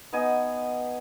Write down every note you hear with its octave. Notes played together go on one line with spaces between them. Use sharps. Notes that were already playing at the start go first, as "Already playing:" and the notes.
B3 D#4 D#5 G#5